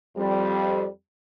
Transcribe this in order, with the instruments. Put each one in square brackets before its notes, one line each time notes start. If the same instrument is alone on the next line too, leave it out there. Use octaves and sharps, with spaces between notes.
[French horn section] F2 G3